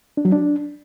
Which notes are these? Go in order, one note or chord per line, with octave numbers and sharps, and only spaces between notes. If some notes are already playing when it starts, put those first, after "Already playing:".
D4
F#3
D4